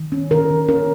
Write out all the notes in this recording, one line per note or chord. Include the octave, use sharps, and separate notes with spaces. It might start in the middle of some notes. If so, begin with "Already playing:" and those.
Already playing: D#3
C#4
D#3 A#4
D#3
C#4 A#4